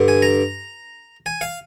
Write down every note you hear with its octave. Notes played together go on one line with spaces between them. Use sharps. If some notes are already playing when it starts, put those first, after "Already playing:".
Already playing: G2 D3
G#5
A#5
G#5
F5